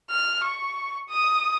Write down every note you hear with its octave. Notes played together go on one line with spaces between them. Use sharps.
F6
C#6
D#6